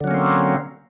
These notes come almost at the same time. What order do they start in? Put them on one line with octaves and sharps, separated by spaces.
D3 F#3 C#4 A#3 C4